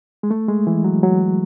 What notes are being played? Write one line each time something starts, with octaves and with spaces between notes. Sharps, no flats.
G#3
A3
G#3
E3
F#3
F#3